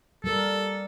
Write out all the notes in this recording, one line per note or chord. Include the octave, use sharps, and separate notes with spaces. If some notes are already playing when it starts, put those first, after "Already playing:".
G3 A4 A#4